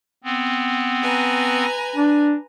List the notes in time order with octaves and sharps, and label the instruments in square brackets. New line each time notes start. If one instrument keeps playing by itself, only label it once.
[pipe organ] B3 C4
[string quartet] B4 G#5 A#5
[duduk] D4